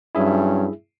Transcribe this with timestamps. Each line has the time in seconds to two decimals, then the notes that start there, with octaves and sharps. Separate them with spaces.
0.15 G2 F#3 C#4 E4 G#4 E5